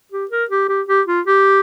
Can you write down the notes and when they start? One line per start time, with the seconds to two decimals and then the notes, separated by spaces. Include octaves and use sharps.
0.12 G4
0.31 A#4
0.50 G4
0.68 G4
0.88 G4
1.07 F4
1.26 G4